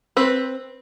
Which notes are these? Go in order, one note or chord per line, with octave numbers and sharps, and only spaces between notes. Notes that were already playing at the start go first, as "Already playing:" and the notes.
C4 B4